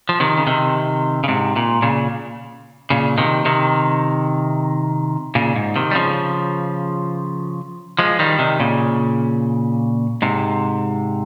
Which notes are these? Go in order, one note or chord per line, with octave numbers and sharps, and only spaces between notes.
F3
C3 D#3
C#3
C3 D#3
C#3
G#2 C3
A#2
A#2 C#3
A#2 C#3
C3 D#3
C3 D#3
A#2 C#3
G#2
C3 D#3
G3
C#3 F3
F3 G#3
D#3 G3
C3 D#3
A#2 C#3
G#2 C3